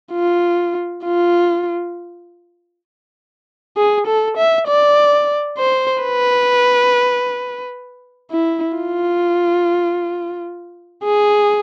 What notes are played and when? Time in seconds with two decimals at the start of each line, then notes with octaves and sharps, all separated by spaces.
0.13 F4
1.04 F4
3.77 G#4
4.07 A4
4.38 E5
4.68 D5
5.59 C5
6.03 B4
8.31 E4
8.77 F4
11.04 G#4